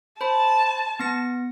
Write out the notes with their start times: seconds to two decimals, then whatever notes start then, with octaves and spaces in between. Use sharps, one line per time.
0.21 C5 A5 B5
0.99 B3 A#6 C#7